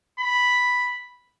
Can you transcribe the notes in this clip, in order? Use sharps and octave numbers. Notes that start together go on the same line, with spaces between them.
B5